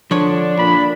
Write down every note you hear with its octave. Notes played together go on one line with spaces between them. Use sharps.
D3 F3 D4 C#5
A#2 B5